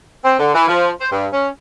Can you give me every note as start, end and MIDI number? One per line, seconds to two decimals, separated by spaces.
0.25 0.38 60
0.39 0.53 50
0.55 0.68 52
0.68 0.89 53
1.00 1.09 72
1.11 1.26 43
1.33 1.48 61